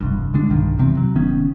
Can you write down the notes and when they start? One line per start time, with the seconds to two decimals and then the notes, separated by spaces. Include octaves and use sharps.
0.01 E1 C2 G2
0.33 D1 D3 G#3 D4
0.50 B1 G2 D#3
0.78 D#1 E2 C3 C4
0.97 F#3
1.16 F1 D#3 B3 C#4